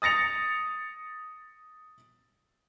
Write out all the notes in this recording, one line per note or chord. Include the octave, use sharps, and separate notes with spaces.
D#6 A6 A#6 C#7 F7